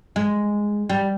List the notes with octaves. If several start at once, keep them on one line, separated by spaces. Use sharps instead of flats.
G#3
G3